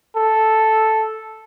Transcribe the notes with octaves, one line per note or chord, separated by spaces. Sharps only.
A4